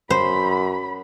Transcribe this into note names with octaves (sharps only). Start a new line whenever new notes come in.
F#2 C5 B5